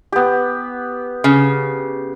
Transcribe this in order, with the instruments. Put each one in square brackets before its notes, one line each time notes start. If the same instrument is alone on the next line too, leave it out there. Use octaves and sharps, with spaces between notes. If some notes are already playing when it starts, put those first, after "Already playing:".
[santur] B3 G4
[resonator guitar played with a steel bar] C#3